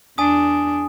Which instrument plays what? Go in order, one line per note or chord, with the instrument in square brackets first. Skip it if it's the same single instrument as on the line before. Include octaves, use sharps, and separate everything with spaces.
[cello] E2 D4 [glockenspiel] G#5 D#6